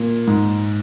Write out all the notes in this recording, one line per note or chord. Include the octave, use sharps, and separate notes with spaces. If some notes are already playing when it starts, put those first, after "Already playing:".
Already playing: A#2
G#2